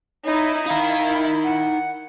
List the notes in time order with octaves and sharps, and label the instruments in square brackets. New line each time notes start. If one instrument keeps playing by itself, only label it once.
[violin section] D#4 E4 [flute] C#5
[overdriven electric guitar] D#4 A#4 [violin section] E4 [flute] F5
[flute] F#5